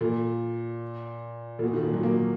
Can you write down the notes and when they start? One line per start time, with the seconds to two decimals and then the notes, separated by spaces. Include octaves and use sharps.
0.01 A#2
1.59 A#2
1.63 B2
1.73 D#3
1.83 A#2
1.93 F#3
2.03 A#3